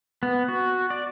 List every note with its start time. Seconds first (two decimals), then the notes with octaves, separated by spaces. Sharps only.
0.23 B3
0.48 F#4
0.90 D5